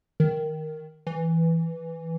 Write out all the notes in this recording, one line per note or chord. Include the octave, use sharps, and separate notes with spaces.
D#3
E3